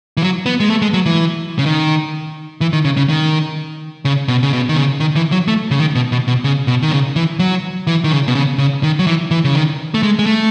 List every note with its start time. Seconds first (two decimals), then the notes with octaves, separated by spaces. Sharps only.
0.17 E3
0.22 F#3
0.46 B3
0.60 G#3
0.70 A3
0.82 G#3
0.93 F#3
1.06 E3
1.59 C#3
1.66 D#3
2.61 E3
2.73 D#3
2.85 C#3
2.97 C#3
3.09 D#3
4.05 C#3
4.28 B2
4.43 C#3
4.53 B2
4.69 D#3
4.77 C#3
5.00 D#3
5.16 E3
5.32 F#3
5.48 A3
5.71 C#3
5.80 D#3
5.95 B2
6.12 B2
6.28 B2
6.44 C#3
6.67 B2
6.83 D#3
6.91 C#3
7.16 E3
7.39 F#3
7.87 E3
8.04 D#3
8.12 C#3
8.28 B2
8.35 C#3
8.58 C#3
8.83 D#3
8.99 F#3
9.07 E3
9.31 E3
9.44 C#3
9.55 D#3
9.94 A3
10.03 G#3
10.19 G#3
10.26 A3